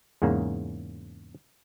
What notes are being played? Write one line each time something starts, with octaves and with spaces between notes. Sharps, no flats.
E2 G#2 C#3 A#3